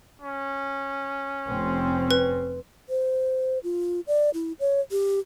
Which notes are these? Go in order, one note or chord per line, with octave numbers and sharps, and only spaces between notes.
C#4
F1 C4
B4
C5
F4
D5
E4
C#5
G4